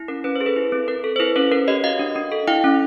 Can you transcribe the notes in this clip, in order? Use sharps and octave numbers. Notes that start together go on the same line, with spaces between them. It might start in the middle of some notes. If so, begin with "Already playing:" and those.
Already playing: E4
C#4 A#4
C#4 B4
C5
G#4
A4 B4
E4
C4
C4 A#4
A4
C5
E4 A4 B4
C#4 A#4 C5
C#4 A#4
G4 C#5 D#5
F#4 D#5 F5
D4
D4
A4
E4 F5 G5
C#4